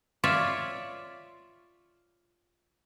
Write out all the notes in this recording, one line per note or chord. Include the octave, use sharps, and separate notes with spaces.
F4 C#5 D5 E5